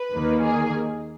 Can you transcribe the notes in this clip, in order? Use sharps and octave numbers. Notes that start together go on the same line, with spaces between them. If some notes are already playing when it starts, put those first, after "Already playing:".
Already playing: B4
D#2 D#3 A#3
G#4